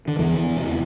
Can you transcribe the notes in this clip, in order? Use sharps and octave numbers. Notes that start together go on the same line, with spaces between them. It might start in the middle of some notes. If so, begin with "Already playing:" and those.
D3
E2 E3
E2
C3